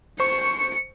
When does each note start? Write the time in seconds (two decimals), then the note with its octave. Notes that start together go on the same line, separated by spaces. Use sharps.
0.20 C5 C#6 C#7